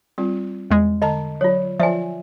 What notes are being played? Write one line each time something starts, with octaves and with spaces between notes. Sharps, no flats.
G3 C4 F4
E2 G#3
D3 D#5 A5 A#5
F#3 F4 C#5
F3 F4 D5 E5 G#5